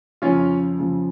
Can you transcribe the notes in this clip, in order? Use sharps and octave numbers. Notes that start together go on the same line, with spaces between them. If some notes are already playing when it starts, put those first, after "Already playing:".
F2 C#3 F3 C#4 F4
F2 C#3 F3